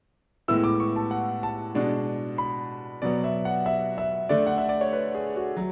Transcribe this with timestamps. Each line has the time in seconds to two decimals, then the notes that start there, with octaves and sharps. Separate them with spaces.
0.48 A2 G#3 B3 E4 E6
0.64 D6
0.80 C#6
0.96 A5
1.11 F#5
1.43 A5
1.75 B2 G#3 D4
2.38 B5
3.02 B2 F#3 B3 D5
3.24 E5
3.45 F#5
3.66 E5
3.98 E5
4.29 D3 A3 D4 D5
4.47 F#5
4.58 E5
4.69 D5
4.81 C#5
4.93 B4
5.14 G#4
5.36 F#4
5.57 F#3